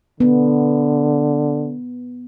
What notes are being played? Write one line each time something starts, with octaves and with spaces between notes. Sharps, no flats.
D3 B3